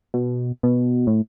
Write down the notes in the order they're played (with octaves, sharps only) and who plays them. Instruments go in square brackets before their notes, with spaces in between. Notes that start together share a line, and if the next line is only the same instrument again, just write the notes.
[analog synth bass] B2
B2
A2